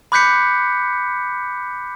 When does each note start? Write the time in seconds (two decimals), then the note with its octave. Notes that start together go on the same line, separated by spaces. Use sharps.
0.12 B5 D6 F#6 G6 B6 C#7